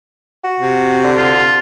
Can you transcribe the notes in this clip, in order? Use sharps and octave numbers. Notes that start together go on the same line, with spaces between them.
F#4
C3
D3
F4